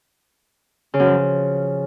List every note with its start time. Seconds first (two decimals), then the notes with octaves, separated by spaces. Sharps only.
0.94 C#3
1.00 F#2
1.06 F3